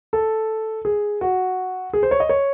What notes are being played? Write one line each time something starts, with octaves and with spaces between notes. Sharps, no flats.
A4
G#4
F#4
G#4
C5
C#5
D#5
C#5